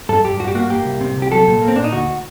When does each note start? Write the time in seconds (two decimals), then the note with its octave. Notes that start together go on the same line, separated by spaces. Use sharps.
0.09 G2 A4
0.24 G2 G4
0.40 G2 F#4
0.47 G4
0.55 A#3 F#4
0.70 A#3 G4
0.85 C2
1.01 C3
1.16 C2
1.22 G4
1.31 F#3 A4
1.47 A#2
1.61 A#3
1.68 C4
1.76 A#2 D4
1.84 D#4
1.92 D2 F#4